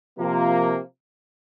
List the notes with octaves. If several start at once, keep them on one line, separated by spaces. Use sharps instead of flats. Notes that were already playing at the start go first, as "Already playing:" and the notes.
C3 F3 A#3